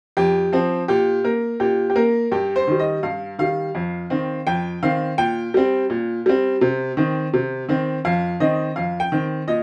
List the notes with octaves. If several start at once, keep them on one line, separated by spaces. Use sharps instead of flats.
F2 G4
F3 C4
A#2 G4
A#3 A#4
A#2 G4
G4
A#3 A#4
G2 G4
C5
D#3 G3
D#5
G2 F5
D#3 G3 F5
F2
D#3 C4
F2 G5
D#3 C4 F5
A#2 G5
G3 C4
A#2
G3 C4
C3
D#3 C4
C3
D#3 C4
F2 F5
D#3 C4 D#5
F2 F5
G5
D#3 C4
A#2 D#5